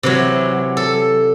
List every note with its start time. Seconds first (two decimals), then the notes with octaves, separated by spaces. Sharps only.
0.03 C3 E3 F#3
0.77 A4